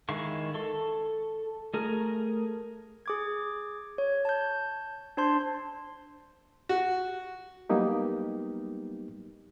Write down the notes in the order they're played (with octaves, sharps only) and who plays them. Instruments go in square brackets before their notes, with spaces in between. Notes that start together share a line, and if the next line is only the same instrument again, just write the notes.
[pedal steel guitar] D#3 G#3 E4 F5 C#6
A4 C#6
A3 G#4 A#4
[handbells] G#4 D6 G#6
C#5
A5 G6
D4 C5 A5 C6 G6
[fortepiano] F#4
[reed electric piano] F#3 G3 A#3 B3 D#4 G4